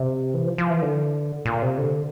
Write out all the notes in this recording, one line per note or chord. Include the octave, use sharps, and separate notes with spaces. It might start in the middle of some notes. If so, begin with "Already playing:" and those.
Already playing: C3
E3
F3
F3
E3
D3
A#2
C3
D3